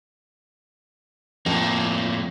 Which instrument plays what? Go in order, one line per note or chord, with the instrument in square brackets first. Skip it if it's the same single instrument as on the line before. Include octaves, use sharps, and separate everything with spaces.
[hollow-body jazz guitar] F2 [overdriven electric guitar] A2 A#3